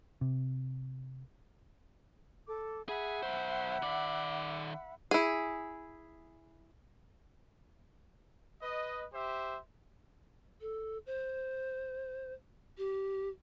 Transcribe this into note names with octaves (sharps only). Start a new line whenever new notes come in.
C3
A4 D6
G#4 E5 F#5 B5
B1 C5
D#3 D5
E4 G#4
B4 D#5
G4 C5 E5
A4
C5
G4